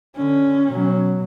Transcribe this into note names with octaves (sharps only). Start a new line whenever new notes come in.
D3 C#4
B2 F#3